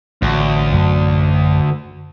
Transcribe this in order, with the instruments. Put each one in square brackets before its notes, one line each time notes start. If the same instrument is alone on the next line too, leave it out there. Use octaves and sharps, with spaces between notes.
[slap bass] A1 [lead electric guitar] D2
[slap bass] A1 F#2 F#3